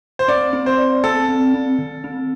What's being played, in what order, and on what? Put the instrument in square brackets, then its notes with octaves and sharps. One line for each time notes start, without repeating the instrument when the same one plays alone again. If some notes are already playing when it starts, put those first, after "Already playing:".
[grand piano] C5
[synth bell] C4 [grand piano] D5
[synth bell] C4
[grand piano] C5
[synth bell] D5
[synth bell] C4 [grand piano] A4
[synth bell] C4
C4
D#3
C4